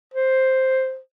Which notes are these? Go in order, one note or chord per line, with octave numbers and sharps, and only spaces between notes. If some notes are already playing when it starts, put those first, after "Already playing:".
C5